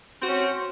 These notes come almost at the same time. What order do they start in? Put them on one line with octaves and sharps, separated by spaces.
C4 F#4 C#4